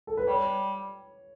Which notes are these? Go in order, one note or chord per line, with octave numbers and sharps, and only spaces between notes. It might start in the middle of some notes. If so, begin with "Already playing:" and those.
A4
B4
G3 C#5